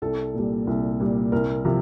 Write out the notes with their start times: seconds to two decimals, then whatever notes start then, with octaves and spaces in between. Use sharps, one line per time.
0.02 C2 A4
0.34 A#2 G3
0.67 C2
1.00 A#2 G3
1.32 C2 A#4
1.65 C3 F3